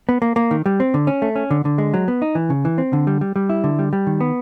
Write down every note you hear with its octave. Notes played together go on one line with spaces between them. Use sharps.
B3
A#3
A#3
D#3
G3
C4
D3
C#4
A3
C#4
D3
D3
G#3
F#3
B3
D#4
E3
C#3
E3
C4
D3
G3
G3
G3
E4
D3
G3
G3
D#3
B3